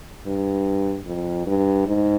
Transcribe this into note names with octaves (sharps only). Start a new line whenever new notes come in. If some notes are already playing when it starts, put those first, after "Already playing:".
G2
F2
G2
G#2